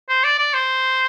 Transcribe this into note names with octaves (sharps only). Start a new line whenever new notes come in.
C5
D5
D5
C5